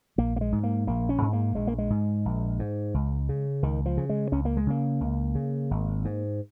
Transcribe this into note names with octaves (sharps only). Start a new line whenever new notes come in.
A#1 A#3
A#3
G#3
G#2
A#3
A#1 A#3
C#4
G#2
A#3
A#1 G#3
A#3
G#3
G#2
A#1
G#2
C#2
C#3
C#2 D#3
F3
C#3
G#3
C#2 C#4
A#3
G#3
C#3 A#3
C#2
C#3
G#1
G#2